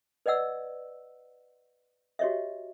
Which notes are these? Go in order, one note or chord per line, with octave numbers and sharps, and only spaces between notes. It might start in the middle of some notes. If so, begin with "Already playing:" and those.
B4 D5 D#5 F#5 E6
F#4 G4 C#5 D#5 E5